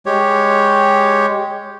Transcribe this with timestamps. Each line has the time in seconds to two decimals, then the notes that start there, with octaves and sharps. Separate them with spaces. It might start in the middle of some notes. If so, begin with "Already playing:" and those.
0.06 G#3 G4 C#5